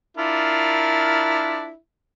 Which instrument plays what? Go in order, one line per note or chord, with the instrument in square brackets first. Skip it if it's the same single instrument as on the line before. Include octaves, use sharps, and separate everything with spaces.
[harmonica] D4 F4 A#4 [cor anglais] E4